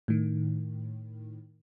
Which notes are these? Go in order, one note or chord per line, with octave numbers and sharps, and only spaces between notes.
A2 D#3